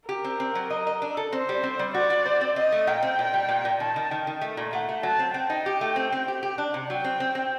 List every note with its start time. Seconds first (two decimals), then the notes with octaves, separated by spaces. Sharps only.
0.09 G4 A#4
0.24 C4
0.40 C4
0.55 F#3
0.70 D#5
0.87 D#5
1.02 D4
1.17 A4
1.33 C4 C5
1.49 G3
1.63 C4
1.79 G3
1.94 F#4 D5
2.10 F#4
2.26 C5
2.41 C4
2.56 C4 D#5
2.72 A3
2.87 A#2 G5
3.03 C4
3.19 A#2
3.34 G3
3.49 A#2
3.65 A#2
3.80 D#3 A5
3.96 D#3
4.10 D#3 G5
4.27 D#3
4.41 A3
4.57 A#2
4.73 A3 F#5
4.89 A3
5.03 F#3 A5
5.19 C4
5.34 C4 G5
5.50 D#4
5.66 G4
5.81 A3
5.96 C4
6.12 C4
6.28 G4
6.43 G4
6.58 D4
6.74 C3
6.89 F#3 G5
7.04 C4
7.20 C4
7.35 C4